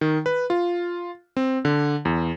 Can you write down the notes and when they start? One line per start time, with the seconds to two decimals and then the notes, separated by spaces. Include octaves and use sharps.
0.01 D#3
0.26 B4
0.50 F4
1.37 C4
1.65 D3
2.05 E2